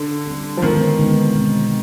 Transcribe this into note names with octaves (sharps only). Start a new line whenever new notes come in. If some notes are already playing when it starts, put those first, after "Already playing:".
Already playing: D3
G3 C4 G4
F3
D3 D#3 G#3 B3 D#4
D3 G#3 B3 D#4
B2 G#3 C4